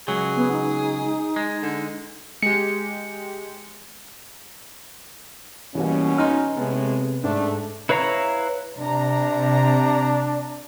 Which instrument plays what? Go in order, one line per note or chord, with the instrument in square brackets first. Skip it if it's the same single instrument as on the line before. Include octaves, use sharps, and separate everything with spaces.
[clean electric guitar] C#2 F#3 [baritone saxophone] G#4
[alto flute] B3
D#4
[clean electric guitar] G#3
[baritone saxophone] D3
[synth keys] G#3 G4 [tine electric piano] C#7
[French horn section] B2 C#4 [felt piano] E3 G3 A#3
[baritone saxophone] D#4 [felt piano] G#5 C6 F6
[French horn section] A2 G#3 [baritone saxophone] C3 [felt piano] B3
[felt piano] G#2 [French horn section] A3 [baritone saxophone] D4
[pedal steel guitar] E4 B4 C#5 F5 A#5
[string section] C3 A#5 [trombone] D4